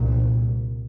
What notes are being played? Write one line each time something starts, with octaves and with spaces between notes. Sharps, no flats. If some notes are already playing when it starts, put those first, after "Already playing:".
Already playing: C2 A#2